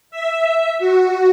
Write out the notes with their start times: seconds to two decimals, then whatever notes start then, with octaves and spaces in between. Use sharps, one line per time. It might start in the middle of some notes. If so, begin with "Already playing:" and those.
0.11 E5
0.79 F#4